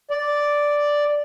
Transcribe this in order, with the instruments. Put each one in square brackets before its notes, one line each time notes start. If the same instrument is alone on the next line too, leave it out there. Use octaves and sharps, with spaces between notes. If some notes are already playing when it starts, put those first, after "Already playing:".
[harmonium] D5